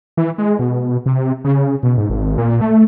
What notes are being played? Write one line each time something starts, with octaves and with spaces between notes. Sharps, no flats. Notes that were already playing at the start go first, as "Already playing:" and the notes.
E3
G#3
B2
C3
C#3
B2
G#2
G#1
A#2
A3